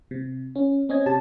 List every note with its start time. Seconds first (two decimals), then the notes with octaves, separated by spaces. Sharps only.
0.11 C3
0.55 C#4
0.89 C4 C#4 D#5 G#6
1.06 C3 G4 A5